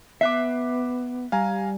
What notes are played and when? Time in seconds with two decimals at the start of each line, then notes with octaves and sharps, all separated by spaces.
0.21 B3 E5 D6 F#6 C7
1.32 G3 F5 G#5 A#5